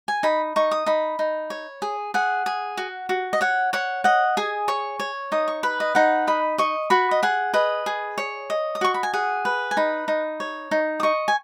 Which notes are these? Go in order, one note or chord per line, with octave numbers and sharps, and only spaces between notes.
G#5
D#4 B5
D#4 C#6
D#6
D#4 B5
D#4
C#5
G#4
G#4 F#5
G#4
F#4
F#4
D#5
C#5 F#5
C#5 F#5
D#5 F#5
G#4 G#5
C#5 C#6
C#5
D#4 D#6
C#6
B4 B5
D#5
D#4 F#5
D#5 B5
D#5 C#6
F#4 B5
D#5
G#4 F#5
B4 D#5
G#4
C#5
D#5
D#6
F#4 C#6
B5
G#5
G#4 F#5
B4
G#5
D#4 B5
D#4
C#5
D#4
D#6
D#5 C#6
G#5